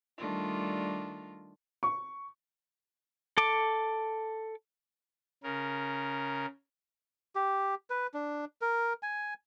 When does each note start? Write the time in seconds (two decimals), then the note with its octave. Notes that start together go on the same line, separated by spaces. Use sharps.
0.18 D#3 G3 A3 D4 F4
1.83 C#6
3.38 A4 D6
5.43 C#3 A#4
7.35 G4
7.90 B4
8.14 D4
8.61 A#4
9.03 G#5